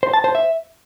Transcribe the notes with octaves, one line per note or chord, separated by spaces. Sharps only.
C5
A5
C5
E5